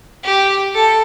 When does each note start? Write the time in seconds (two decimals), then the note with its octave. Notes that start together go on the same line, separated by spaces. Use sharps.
0.24 G4
0.74 A4